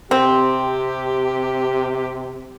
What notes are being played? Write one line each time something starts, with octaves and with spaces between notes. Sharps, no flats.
C3 C4 G4